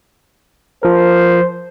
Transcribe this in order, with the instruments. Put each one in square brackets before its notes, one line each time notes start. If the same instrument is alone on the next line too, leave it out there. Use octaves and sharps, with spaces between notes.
[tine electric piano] F3 A#4 [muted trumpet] C5